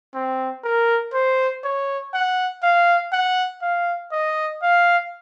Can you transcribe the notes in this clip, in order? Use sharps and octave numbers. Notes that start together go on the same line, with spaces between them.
C4
A#4
C5
C#5
F#5
F5
F#5
F5
D#5
F5